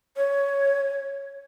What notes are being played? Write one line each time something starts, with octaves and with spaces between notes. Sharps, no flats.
C#5